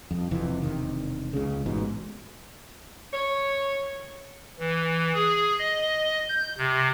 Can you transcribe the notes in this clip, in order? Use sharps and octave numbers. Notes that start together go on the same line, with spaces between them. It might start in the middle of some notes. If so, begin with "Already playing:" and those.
F2
E1 F2 C3 E3
E1 C3 D#3
C#2 C#3
A1 G#2 B2
C#5
E3
G#4
D#5
G6
C3